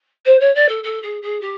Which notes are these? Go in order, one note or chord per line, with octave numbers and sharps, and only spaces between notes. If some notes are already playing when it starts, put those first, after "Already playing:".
C5
C#5
D5
A4
A4
G#4
G#4
G4